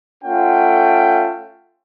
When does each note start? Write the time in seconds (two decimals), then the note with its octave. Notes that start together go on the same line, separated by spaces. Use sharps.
0.23 A3 C#4 F4 F#5 G5